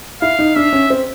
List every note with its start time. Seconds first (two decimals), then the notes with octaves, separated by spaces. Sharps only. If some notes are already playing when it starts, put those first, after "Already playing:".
0.22 E4 F5
0.39 D#4
0.56 D4 E5
0.73 C#4
0.90 C4